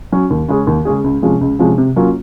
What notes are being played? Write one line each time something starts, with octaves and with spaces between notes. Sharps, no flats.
F#3 C#4
D#2
C#3 G#3 C#4 G#4
D#2
C#3 G#3 C#4 G#4
C#2
C3 F3 G#3 C#4
C#2
C3 F3 G#3 C#4
C3
F#3 A#3 C#4 F4